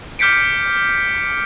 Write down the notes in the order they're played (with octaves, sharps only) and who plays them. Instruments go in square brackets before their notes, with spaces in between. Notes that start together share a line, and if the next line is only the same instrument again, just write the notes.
[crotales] D6 F6 G6 B6 C#7 D7